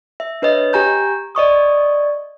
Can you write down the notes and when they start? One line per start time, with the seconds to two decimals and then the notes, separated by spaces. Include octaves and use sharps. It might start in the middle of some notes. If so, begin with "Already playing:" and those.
0.20 E5
0.42 D4 B4 C#5 D#5
0.73 G4 G#5 A#5 G6
1.35 D5 D#5 C#6 D#6